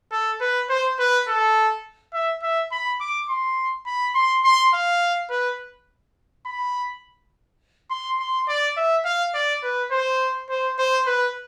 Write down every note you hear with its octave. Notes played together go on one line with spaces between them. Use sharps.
A4
B4
C5
B4
A4
E5
E5
B5
D6
C6
B5
C6
C6
F5
B4
B5
C6
C6
D5
E5
F5
D5
B4
C5
C5
C5
B4